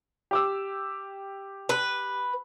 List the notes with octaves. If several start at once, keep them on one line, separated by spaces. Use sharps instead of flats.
G4 D6 E6
B4